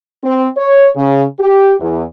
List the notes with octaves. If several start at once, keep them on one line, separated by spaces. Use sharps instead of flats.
C4
C#5
C#3
G4
E2